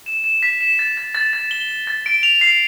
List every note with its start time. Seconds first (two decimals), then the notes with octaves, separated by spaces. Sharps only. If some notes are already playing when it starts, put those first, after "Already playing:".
0.06 E7
0.24 E7
0.43 B6
0.61 E7
0.79 A6
0.97 A6
1.15 A6
1.33 A6
1.51 G7
1.69 G7
1.87 A6
2.06 D7
2.23 F7
2.41 C7